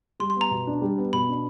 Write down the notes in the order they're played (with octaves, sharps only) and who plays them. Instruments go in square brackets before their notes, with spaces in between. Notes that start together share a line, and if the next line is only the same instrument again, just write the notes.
[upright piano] G3 [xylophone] C6
[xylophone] C6
[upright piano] B3
[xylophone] A#5
[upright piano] B2
D4
G3
B3
[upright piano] B2 [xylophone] B5
[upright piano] D4